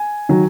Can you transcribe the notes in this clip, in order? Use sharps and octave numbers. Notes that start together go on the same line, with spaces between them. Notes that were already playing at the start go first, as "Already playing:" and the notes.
Already playing: G#5
D#3 F#3